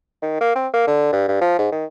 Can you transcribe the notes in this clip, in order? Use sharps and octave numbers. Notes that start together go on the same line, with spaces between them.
D#3
A#3
C4
A#3
D3
G2
G2
F3
G#2
D#3